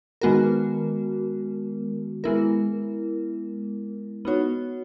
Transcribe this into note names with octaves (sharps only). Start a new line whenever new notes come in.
D#3 G#3 B3 F#4 A#4
G#3 B3 E4 A#4
B3 D#4 F#4 C#5